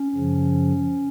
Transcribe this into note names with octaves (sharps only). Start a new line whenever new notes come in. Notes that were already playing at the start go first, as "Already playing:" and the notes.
Already playing: C#4
F#2 C#3 F3